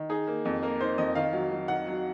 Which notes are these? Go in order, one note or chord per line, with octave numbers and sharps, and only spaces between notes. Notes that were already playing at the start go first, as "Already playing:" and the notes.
Already playing: D#3
D#4 G#4
A#3
F2
A#3 A#4
D#4 C5
F2 D#5
D#3 F5
F#3
F#3
D#3 F#5
F#3